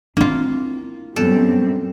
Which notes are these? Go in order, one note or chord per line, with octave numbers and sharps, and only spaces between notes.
A#3 C4 D4 E4 F4
F#2 A#2 G3 B3 C4 A4